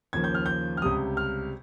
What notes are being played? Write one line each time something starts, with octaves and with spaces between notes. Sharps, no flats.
D#2 C#3 F3 A#3 G#6
G6
F6
G6
F6
C#2 C3 G3 D#6
F6